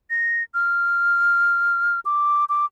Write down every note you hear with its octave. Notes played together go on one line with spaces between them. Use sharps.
A#6
F6
D6
D6